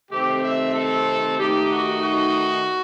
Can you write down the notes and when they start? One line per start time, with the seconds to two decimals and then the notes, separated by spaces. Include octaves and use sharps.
0.11 C3 D#3 A3 C4 G4
0.43 E5
0.75 A4
1.39 D#3 A3 D#4 G4
1.71 F#4
2.02 F#4